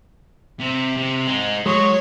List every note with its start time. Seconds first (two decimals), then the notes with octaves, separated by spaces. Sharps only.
0.60 C3
0.97 C3
1.27 G#3 D#4
1.66 F#3 G#3 C#5